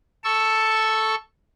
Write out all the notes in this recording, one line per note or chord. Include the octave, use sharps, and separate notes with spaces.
A4 C#6 E6